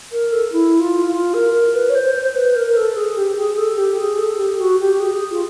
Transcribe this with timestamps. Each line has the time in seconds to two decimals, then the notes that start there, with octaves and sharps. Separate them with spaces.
0.12 A#4
0.32 A4
0.52 E4
0.79 F4
1.06 F4
1.33 A#4
1.53 A#4
1.74 B4
1.89 C#5
1.94 C5
2.15 C5
2.35 B4
2.55 A#4
2.67 A#4
2.76 A4
2.96 G#4
3.16 G4
3.36 G#4
3.57 A4
3.77 G4
3.98 G#4
4.18 A4
4.38 G4
4.59 F#4
4.79 G4
4.99 G#4
5.30 F4